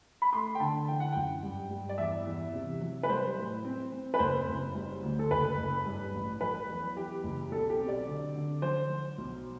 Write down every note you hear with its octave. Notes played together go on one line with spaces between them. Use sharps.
B5
A3 C6
G5
D3 A5
E3 G5
F#5
F#2 G5
G2
G2
D5
E2 E5
E2
C3
F#3
B4
G3 C5
A2
C4
C4
B4
F#1 C5
F#1
G3
D2
A4
F#1 B4
F#1
G2
A1
F#3 B4
E2
E3 G4
F#1
B1 A4
G4
C4
D5
D3
D3
F#3 C5
F#3
B1